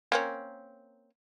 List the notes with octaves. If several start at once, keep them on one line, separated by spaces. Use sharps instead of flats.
A#3 C4 C#4